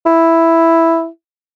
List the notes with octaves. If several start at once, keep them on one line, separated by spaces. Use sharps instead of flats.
E4